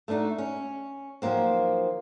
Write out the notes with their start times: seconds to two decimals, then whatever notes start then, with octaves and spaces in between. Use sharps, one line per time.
0.08 A3 B3 D4 D#4 F#4
0.38 C#4
1.22 D#3 F3 F#3 A#3 C4